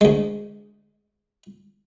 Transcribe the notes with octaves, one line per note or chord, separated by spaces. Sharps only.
D2 G#3